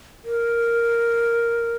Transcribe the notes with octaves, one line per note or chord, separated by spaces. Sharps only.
A#4